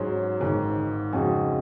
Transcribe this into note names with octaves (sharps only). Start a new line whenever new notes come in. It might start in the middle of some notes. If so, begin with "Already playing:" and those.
Already playing: G#2 F#3 C#4 G#4 C5
G#1 G#2 D#3
F2 C#3 G#3 D#4 F#4